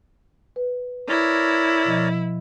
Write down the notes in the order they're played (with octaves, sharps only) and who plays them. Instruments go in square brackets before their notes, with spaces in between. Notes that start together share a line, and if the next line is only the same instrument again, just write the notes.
[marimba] B4
[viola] E4 [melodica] A#4 C#5 D5
[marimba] B2 F3 D#5